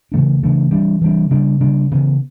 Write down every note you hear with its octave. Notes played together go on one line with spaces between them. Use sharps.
C#3 E3 A3 D4
C#3 E3 A3 D4
E3 G3 D4
E3 G3 D4
C#3 G3 D4
C#3 G3 D4
C#3 E3 B3